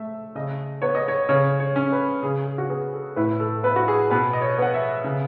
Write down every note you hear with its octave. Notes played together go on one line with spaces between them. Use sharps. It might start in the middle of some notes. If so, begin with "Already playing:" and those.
Already playing: A3 E5
C#3 D#5
B3 C#5
D#5
C#5
C#3 C#5
C#5
C#4
B4
C#3 G#4
G#4
F#4
B3 G#4
A4
A2 B4
A4
B3 B4
F#4
G#4
B2 B4
D#5
C#5
B3 F#5
E5
C#3